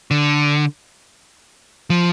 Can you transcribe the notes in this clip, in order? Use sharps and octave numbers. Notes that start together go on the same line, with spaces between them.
D3
F3